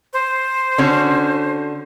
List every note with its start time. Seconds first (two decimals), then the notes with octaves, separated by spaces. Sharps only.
0.13 C5
0.78 D3 C#4 F#4